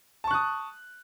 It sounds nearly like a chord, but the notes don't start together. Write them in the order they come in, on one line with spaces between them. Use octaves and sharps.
A5 C#6 F#6 D#6